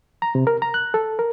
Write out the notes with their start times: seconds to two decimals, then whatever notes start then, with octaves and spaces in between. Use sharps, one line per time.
0.22 A#5
0.35 C3
0.47 A#4
0.62 A#5
0.74 F#6
0.94 A4
1.19 A#4